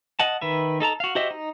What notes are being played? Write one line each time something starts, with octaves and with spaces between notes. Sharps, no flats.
D#5 F#5 A5
D#3 B4 E5
D#4 A4 A5 A#5
F#4 F5
F#4 G4 C5 D#5 E5
D#4